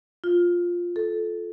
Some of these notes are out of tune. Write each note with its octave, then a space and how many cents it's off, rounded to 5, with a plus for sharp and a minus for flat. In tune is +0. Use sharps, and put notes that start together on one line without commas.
F4 +5
A4 -15